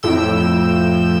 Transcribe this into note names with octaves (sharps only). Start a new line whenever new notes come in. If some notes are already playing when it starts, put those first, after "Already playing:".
F2 A2 G5 E6